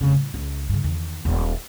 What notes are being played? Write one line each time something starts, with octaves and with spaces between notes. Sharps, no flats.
F1 C#3
A2 G3
C#2
G2 C#3
E2 D#3
D#1